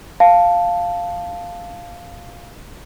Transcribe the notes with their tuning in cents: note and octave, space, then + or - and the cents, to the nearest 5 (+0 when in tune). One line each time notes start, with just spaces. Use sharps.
F5 +0 A5 +0